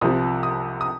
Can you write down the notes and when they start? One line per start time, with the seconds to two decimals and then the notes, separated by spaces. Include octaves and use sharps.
0.01 C2 C3 F3 D#6
0.43 D#6
0.81 D#6